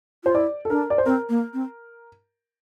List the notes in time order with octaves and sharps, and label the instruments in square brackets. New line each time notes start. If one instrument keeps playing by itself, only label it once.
[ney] F4 [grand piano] C5
[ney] E4 [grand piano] D5
[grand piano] A4
[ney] D4 [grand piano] A#4
[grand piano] D5
C5
[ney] C4 [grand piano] A#4
[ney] A#3
C4